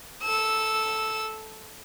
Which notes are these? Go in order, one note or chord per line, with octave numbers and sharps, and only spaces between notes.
A4 E6